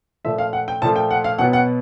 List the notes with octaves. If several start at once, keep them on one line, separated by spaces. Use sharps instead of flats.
A#2 F3 A3 E5
F5
F#5
G5
A#2 F3 A3 A5
G5
F#5
F5
B2 F#3 B3 F#5
F#5